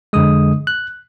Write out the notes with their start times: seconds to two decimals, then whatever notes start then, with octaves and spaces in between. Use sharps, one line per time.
0.13 F2 D3 G#3 D#6
0.67 F#6